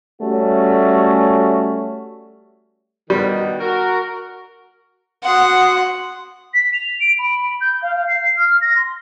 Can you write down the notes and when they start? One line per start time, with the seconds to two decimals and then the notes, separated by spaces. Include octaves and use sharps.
0.21 G3 A3 C#4 F#4
3.10 B2 D#3 G3
3.60 F#4 A#4
5.24 F#4 F#5 C6 D#6
6.53 B6
6.74 F7
7.00 D7
7.18 B5
7.60 G6
7.82 F5
7.95 F5
8.07 C7
8.36 F6
8.61 A#6
8.76 C6